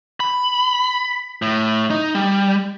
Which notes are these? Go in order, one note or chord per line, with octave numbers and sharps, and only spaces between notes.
B5
A2
D#4
G3